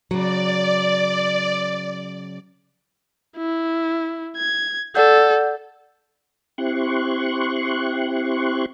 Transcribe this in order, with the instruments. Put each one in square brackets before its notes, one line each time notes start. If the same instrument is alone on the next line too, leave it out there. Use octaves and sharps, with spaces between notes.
[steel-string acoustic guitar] C#3 F#3 [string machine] D5
[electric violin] E4
G#6
[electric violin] A4 [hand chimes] D5 F#5 G6
[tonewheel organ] C4 E4 G4 C6 C#6 F#6